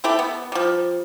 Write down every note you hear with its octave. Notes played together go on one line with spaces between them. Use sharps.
A3 E4 G4 A4
B3
F3 G3